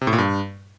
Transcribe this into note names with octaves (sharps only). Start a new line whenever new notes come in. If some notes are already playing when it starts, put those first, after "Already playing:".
C3
A2
A#2
G2